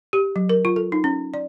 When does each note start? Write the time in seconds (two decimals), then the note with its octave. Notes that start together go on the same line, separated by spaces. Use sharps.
0.13 G4
0.36 F#3
0.49 A#4
0.65 F4
0.76 A4
0.92 D#4
1.04 C#4
1.34 D5